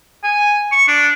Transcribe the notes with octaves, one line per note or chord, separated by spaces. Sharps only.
G#5
C#6
D4